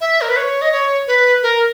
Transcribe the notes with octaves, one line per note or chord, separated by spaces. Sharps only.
E5
A#4
B4
C#5
D#5
C#5
B4
A#4